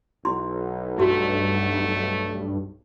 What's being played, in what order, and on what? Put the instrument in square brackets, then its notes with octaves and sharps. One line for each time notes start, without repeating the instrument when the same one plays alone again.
[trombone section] B1 [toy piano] E4 C6
[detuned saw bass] G2 [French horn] A3 [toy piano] E4 F#4